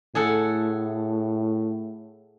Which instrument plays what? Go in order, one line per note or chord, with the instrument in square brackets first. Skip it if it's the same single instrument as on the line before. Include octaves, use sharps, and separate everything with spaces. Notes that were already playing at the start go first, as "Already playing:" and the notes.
[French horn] A2 [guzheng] G#4 A4 F#5